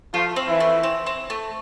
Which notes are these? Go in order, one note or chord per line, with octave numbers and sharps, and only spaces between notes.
F3 A3 F4
C4
E3 E4
A3
C4
C4
A3